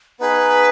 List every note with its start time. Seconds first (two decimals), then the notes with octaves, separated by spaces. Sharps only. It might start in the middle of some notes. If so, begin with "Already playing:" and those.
0.19 B3 D#4 G#4 B4